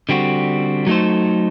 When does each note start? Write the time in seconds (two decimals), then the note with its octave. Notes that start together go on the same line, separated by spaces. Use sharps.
0.09 D3 G3 C4 F#4
0.87 F#3 A3 D#4 A4 C5